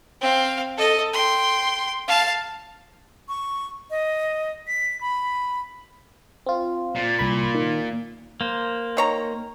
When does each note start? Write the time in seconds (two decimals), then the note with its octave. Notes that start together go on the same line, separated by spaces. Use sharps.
0.21 C4 F5
0.77 A4 D#5
1.13 G5 C6
2.08 F5 A5
3.29 C#6
3.91 D#5
4.67 B6
5.01 B5
6.46 C4 F4
6.95 A#2
7.19 C2 B5
7.55 D#3
8.41 A#3 C5
8.97 D#3 C#5 A#5